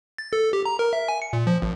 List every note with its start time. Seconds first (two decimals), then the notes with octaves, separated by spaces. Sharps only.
0.18 A6
0.33 A4
0.53 G4
0.66 A#5
0.79 A#4
0.93 E5
1.08 G#5
1.22 C#7
1.33 A#2
1.47 F3
1.62 G#1